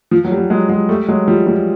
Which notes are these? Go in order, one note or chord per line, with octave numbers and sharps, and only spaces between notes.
F3
F#3
G3
F#3
F#3 G#3
F#3 G#3
G3 A3
F#3 G#3
F3 G3
F3 G3